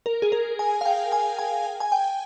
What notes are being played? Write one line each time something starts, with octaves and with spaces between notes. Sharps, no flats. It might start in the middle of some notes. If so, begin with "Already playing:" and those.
A#4
G#4
A#4
G#5
F5
G5
G#5
G#5
G#5
G5